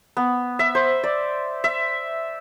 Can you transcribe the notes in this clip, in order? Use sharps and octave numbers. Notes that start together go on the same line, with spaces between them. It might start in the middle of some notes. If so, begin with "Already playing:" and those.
B3
E5
C5
D5
E5